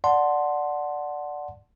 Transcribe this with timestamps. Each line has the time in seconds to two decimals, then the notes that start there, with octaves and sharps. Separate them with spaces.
0.04 D5 F#5 A5 C6